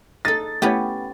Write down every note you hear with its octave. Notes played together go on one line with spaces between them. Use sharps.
D#4 A4 A6
A3 B3 C#4 E4 G4 C#5